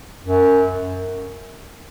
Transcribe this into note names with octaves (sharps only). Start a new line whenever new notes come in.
F#2